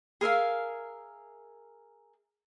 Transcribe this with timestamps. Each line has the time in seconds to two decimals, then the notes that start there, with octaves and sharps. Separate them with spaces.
0.21 G#4 A#4 E5 F5